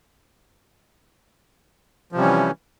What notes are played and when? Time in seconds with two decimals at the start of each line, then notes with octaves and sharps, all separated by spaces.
2.12 F3
2.15 C3
2.18 G3
2.21 C#4
2.23 E3